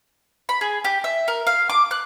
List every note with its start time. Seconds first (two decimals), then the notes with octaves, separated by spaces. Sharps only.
0.49 B5
0.61 G#4
0.84 G4
1.04 E5
1.28 A#4
1.47 F5
1.70 D6
1.91 F#6